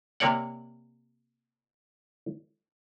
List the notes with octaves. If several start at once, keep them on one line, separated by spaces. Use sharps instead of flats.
C3 A#3 C#5 D5 F#5